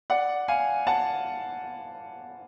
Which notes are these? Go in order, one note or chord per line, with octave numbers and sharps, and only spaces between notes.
D5 F#5
F5 G#5
F#5 A5